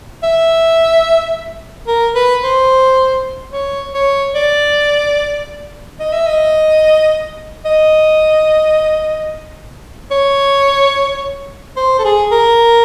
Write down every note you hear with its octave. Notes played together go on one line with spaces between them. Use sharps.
E5
A#4
B4
C5
C#5
C#5
D5
D#5
E5
D#5
D#5
C#5
C5
A4
G#4
A#4